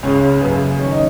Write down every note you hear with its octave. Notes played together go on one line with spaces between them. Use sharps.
C#2 C#3 C#4
F#2 C#3 B3
F#2 D#3 C#4
D#4